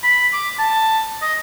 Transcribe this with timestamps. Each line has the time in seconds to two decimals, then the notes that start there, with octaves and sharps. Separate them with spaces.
0.04 B5
0.33 D6
0.59 A5
1.22 D#5